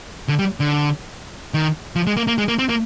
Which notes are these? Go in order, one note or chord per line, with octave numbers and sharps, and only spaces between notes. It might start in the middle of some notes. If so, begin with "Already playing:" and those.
D3
G3
D3
D#3
F3
G#3
A#3
A#3
G#3
A#3
C4
A#3